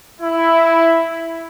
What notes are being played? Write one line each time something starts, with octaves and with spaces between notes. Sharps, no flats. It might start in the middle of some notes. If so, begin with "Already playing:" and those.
E4